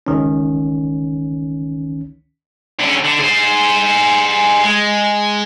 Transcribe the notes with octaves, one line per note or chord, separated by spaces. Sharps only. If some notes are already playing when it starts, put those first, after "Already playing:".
G1 C#2 D#3 C#4
D3 C#4
D3
G#4 C5
G#3